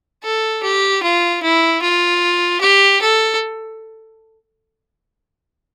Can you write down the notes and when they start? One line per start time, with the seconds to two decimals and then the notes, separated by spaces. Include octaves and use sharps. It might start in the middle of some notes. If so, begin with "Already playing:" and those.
0.23 A4
0.63 G4
1.03 F4
1.43 E4
1.82 F4
2.61 G4
3.01 A4